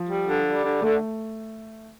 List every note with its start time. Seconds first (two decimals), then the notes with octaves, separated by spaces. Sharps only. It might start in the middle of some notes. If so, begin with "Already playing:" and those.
Already playing: F3
0.09 G3
0.27 D3
0.45 G3
0.64 D3
0.82 D3 A3